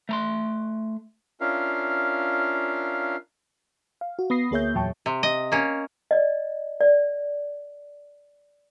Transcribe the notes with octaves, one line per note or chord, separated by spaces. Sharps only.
A3 A#5 C6
C#4 D4 F4 A#4 E5 F5
F5
F#4
B3 B5 D#6 A#6 C7
D2 A#3 G#4 C#5 E5 G6
E2 A#2 F#3 G5 A5 C#6
C3
D#5
A#3 C#4
D5 D#5
D5